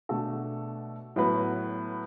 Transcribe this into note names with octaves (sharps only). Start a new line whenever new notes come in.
B2 A3 D4 F#4 A4
A2 F#3 B3 F#4 B4